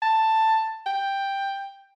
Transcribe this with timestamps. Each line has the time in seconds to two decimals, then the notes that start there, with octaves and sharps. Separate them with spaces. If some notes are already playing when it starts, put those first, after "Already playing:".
0.02 A5
0.86 G5